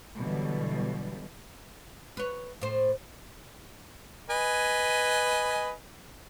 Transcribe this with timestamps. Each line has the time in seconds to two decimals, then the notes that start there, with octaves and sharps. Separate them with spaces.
0.18 B2 D3 E3 F#3 G3
2.17 B4 C#5
2.61 A2 C5
4.30 B4 D#5 G#5